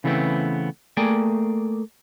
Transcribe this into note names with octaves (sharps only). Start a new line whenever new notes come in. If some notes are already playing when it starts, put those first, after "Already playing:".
C#3 E3 G3 A3 B3 C4
A3 A#3 G#4 D5 G5 G#5